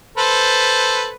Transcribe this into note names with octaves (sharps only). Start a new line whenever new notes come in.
A4 B4 C5